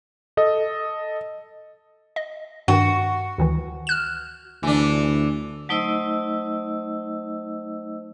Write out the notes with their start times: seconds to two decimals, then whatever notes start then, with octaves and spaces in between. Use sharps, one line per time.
0.37 A4 D#5
2.16 D#5
2.68 G2 D#3 F#4
3.38 D2 D#3 E3
3.87 F6 F#6 E7
4.63 D2 E3 D4
5.69 F#3 A3 D#4 C5 D#5 E6